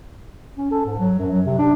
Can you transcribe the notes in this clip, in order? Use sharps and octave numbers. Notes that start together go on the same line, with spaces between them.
C#4
A4
G#2
F#3
F#2
F#3
C3
D4